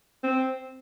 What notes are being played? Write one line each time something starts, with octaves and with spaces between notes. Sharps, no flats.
C4